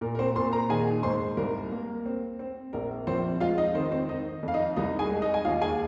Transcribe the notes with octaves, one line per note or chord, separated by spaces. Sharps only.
A#2 A#4
A#4
C4 C5
A#2 C5 C6
A#4 A#5
D#3 G#4 G#5
G#2 C5 C6
C2 A#4
A#3
C4
C4
A#1 A#4
F3 C4 C5
G#3 F4 F5
D#4 D#5
D#3 C4 C5
C4 C5
D#3 D#4 D#5
F2 F5
D#4 D#5
C2 D#4 D#5
G#4 G#5
G#3
D#4 D#5
G#5
D#2 F4 F5
G#4 G#5